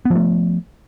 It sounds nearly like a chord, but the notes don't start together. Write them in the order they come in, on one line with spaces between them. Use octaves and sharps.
B3 F3 A3